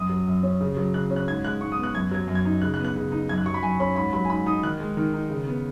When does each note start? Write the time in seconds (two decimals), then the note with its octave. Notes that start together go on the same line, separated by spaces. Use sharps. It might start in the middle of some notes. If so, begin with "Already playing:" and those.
Already playing: F#2 D#6
0.09 F#3
0.27 F#2
0.43 C#4
0.61 C#3
0.77 F#3
0.94 C#3 F#6
1.10 C#4
1.16 F#6
1.28 G#2 G#6
1.44 G#3 F#6
1.61 G#2 C#6
1.72 D#6
1.78 B3
1.83 F#6
1.95 F#2 G#6
2.11 F#3 G#6
2.28 F#2
2.35 G#6
2.45 D#4
2.62 C#3 F#6
2.74 F#6
2.79 B3
2.85 F#6
2.96 C#3
3.12 D#4
3.29 F#2 G#6
3.38 F#6
3.46 F#3 C#6
3.54 B5
3.63 F#2 G#5
3.80 C#4 B5
3.96 G#2 B5
4.13 F#3 B5
4.25 G#5
4.30 G#2 B5
4.46 D#4 D#6
4.63 D#3 F#6
4.80 G#3
4.97 D#3
5.14 D#4
5.30 C#3
5.47 B3